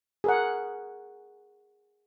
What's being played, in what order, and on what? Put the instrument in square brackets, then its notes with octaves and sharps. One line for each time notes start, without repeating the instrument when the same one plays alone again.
[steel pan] G#4 A#4 F#5